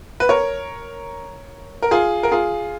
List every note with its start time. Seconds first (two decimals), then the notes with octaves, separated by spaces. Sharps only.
0.20 B4
0.29 A#4 C#5
1.82 A#4
1.91 F4 G#4
2.23 A#4
2.31 F4 G#4